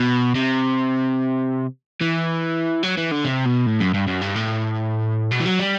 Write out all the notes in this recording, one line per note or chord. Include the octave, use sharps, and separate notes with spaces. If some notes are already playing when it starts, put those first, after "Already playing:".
Already playing: B2
C3
E3
F#3
E3
D3
C3
B2
A2
F#2
G2
F#2
G2
A2
B2
E3
F#3
G3